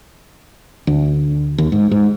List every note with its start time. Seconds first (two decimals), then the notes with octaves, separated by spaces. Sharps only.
0.87 D2
1.58 D#2
1.72 G#2
1.91 G#2